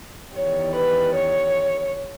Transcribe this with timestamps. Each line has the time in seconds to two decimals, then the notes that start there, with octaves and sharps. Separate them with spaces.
0.34 E2 D#3 G3 C#5
0.74 B4
1.14 C#5